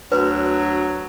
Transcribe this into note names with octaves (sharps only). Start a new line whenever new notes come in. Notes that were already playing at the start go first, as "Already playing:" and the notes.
D2 F#3 B4